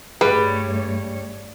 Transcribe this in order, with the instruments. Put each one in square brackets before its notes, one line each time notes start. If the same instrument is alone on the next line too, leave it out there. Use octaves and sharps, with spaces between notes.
[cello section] G2 A3 C#5 [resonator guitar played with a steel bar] G3 [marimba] G#4 [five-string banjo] B4